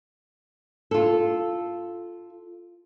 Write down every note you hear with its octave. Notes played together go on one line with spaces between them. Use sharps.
F4 A4